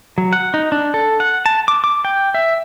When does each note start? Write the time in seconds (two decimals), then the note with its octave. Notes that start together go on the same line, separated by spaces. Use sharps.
0.18 F#3
0.33 F#5
0.54 D#4
0.72 D4
0.94 A4
1.20 F#5
1.46 A5
1.68 D6
1.84 D6
2.05 G5
2.34 E5